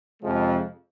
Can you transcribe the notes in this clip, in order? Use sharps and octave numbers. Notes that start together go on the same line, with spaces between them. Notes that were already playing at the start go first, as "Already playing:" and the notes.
F2 C3 F3 G#3